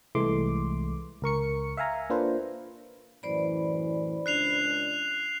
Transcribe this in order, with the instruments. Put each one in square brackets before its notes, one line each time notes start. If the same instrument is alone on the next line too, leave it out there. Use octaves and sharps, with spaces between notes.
[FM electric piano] C2 E3 G#3 A3 C6 D6
C#2 A#4 C#6 C#7
E5 F5 G#5 A#5
A#3 D4 F4 B4 C5
[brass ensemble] F#2 A2 E3 [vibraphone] C5 D5 B5
[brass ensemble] C#2 D4 [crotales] F#6 C7 F7